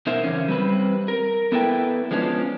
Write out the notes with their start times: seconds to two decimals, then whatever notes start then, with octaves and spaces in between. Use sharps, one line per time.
0.07 B2 D#4 A#4 C5 E5
0.24 C#3 E3 C#4
0.48 G3 C4 B4
1.08 A#4
1.52 B3 E4 A4 B4 G5
2.11 F3 G#3 B3 C#4 D4